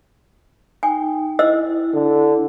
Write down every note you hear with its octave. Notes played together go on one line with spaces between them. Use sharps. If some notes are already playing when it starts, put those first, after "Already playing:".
D#4 G5 G#5
E4 C5 D#5 E6
D3